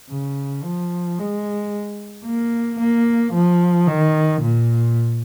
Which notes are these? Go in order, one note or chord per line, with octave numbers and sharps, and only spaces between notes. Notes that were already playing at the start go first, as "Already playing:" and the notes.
C#3
F3
G#3
A#3
A#3
F3
D#3
A#2